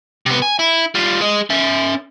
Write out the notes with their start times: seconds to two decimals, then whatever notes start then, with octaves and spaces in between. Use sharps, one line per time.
0.26 C3 B3
0.42 G#5
0.59 E4
0.95 G3 F4
1.21 G#4 D#5
1.50 C#4 E5